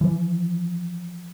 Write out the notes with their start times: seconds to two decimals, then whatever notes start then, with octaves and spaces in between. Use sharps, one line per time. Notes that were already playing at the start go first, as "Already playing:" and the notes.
0.01 E3 F3